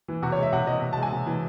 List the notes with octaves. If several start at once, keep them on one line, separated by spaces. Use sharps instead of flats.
E3
C3 F#4
C#5
G#3
E5
C3 F#5
E3 D#5
C3
A5
G#3
G#5
C3
E3